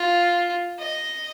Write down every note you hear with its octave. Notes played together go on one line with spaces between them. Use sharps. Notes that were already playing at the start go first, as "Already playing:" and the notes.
Already playing: F4
D#5